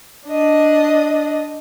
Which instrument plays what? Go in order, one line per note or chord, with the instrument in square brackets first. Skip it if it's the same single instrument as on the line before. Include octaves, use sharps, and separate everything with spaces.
[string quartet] D4 D#5